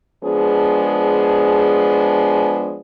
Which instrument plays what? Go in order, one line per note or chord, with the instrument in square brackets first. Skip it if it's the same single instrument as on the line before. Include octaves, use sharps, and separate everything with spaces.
[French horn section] F3 G#3 B3 D4 G#4